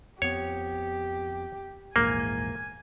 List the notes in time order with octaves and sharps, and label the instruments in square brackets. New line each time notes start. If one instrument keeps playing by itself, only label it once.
[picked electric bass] F2 B3 [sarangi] G4 [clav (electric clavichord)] C#5
[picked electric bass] A#1 E2 G#2 [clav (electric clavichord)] A#3 [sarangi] G#5